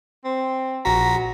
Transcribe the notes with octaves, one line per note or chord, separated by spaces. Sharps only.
C4
A#1 F#4 A#5 B6